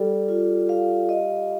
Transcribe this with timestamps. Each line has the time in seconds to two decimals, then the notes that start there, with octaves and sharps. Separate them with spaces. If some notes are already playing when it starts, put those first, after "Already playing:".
Already playing: G3 A4 D5
0.28 F4
0.69 F5
1.09 D#5